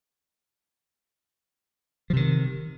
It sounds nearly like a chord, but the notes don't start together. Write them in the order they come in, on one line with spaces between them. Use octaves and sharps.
F3 C3 D#3